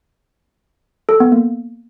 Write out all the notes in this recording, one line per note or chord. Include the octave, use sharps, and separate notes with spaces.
A4
B3
A#3